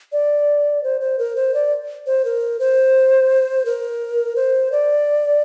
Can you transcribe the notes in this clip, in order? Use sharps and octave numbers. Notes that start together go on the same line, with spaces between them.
D5
C5
C5
A#4
C5
D5
C5
A#4
C5
A#4
C5
D5